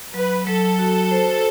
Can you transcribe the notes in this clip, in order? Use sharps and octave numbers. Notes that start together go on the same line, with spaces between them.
F#3 B4
F#3 A4
F#4
C5